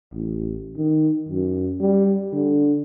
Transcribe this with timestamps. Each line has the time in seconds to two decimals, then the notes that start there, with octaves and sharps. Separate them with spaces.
0.14 A1
0.77 D#3
1.29 F#2
1.80 G3
2.33 D3